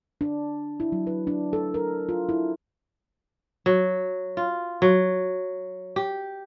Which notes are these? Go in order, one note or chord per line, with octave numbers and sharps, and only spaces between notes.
D4
E4
F#3
B4
D4
A4
A#4
F4
E4
F#3
F4
F#3
G4